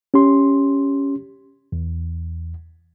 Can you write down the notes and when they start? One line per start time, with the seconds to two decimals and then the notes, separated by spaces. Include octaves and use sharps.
0.14 C#4 G4 C6
1.72 E2